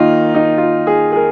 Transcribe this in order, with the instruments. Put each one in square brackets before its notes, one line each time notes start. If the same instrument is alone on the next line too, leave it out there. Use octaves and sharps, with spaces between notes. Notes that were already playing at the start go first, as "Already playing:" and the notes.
Already playing: [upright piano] D#3 A#3 D#4 F4
D#4
F4
G#4
G#4
A#4